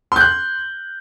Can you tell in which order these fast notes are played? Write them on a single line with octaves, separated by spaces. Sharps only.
C6 G6 F#6